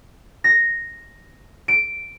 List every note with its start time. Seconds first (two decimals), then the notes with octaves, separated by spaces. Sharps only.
0.44 A#6
1.68 D7